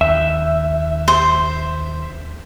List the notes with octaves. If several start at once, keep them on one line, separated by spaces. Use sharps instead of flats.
D#2 E5
C5